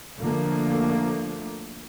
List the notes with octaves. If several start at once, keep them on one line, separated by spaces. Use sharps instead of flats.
D3 F3 A3 A#3